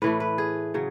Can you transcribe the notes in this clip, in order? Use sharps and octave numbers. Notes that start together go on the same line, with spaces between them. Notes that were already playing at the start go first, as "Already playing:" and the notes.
A2 E3 A3 B4
B4
G#4
C#3 F#3